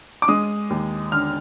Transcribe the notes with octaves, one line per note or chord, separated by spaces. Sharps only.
D6
G#3 D#6
D#2
D3 F6